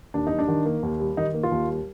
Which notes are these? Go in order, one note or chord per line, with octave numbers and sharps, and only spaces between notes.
D#2 D4
G3 D#4
D4
D#3
A#3
D#2
G3
D#3 D#4
A#3
F4
D#2
G3